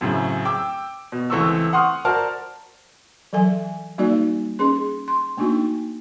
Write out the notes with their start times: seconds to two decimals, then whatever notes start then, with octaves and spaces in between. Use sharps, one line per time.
0.01 F#2 A2 C#3 C4
0.45 G5 D6 E6
1.12 B2
1.30 C#2 E3 A3 C4 C#6 E6
1.73 F#5 C6 C#6 D#6 F6
2.05 F#4 A#4 C5 D5 A5 F6
3.33 E3 F#3 A4 G#5
3.98 G3 A#3 D#4 F#4 D5
4.59 C#4 G#4 C6
5.08 C6
5.37 A3 A#3 D4 D#4 F#4